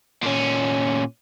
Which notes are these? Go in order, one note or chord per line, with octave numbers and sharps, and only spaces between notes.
A#2 C#4